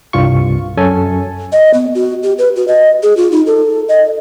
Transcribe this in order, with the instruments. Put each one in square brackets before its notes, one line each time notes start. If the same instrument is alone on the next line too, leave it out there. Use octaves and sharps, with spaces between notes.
[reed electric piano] C2 G2 F4 C#6
F#2 C#4 A4 G#5
[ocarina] D#5
B3
F#4
G4
B4
F#4
D#5
G#4
F4
D#4
A4
D#5